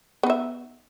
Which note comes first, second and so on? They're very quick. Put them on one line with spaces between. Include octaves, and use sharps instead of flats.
B3 D#4 E5